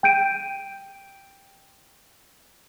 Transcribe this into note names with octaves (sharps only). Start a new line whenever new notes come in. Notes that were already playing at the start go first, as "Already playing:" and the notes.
G5 G6 D7 D#7